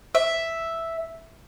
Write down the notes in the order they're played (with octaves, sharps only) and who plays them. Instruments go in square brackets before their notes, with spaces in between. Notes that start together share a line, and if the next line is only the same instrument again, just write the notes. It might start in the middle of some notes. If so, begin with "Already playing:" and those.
[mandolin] E5